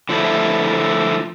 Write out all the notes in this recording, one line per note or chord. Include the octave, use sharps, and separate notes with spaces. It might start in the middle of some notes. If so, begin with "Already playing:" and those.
D3 F3 A3 E4